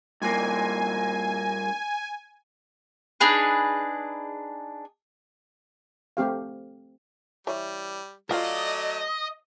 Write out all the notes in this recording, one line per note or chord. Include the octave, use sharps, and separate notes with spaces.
G2 A#2 A#3 G#5
D4 D#4 G#4 B4
A3 C4 G4 F5
E3 G3 C#5
F#3 A3 F4 C5 D5 D#5 F5